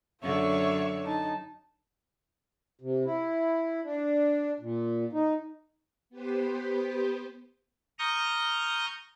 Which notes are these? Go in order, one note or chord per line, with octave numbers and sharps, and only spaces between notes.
F#2 D3 C#5 E5 C#6
D#4 A5
C3
E4
D4
A#2
D#4
B3 G4 B4 C5
A#5 C#6 D#6 F6 G6 A#6